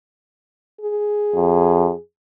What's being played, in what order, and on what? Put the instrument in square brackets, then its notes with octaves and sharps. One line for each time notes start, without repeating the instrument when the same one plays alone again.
[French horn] G#4
[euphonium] F2